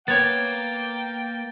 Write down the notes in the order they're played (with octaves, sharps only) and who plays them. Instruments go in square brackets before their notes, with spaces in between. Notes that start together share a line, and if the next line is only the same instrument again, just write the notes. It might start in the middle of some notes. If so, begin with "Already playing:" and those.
[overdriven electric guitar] A#3 [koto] B3 C#5 [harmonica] G5 [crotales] A6